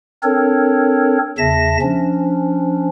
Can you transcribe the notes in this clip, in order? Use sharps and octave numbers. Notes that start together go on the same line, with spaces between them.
C4 D4 A4 A#4 C#5
E2 C#3 E5 A5 A#6
F3 C#4 D4